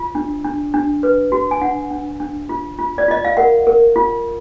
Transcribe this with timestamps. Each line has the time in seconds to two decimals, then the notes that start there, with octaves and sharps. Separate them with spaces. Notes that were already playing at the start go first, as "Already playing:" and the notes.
Already playing: F4
0.15 D4
0.44 D4
0.74 D4
1.03 B4
1.32 F#4
1.51 G#5
1.61 D4 F#5
1.91 D4
2.20 D4
2.49 F4
2.79 F4
2.98 D5
3.08 F4 D#5
3.25 F5
3.37 A#4 F#5
3.67 A#4
3.96 F4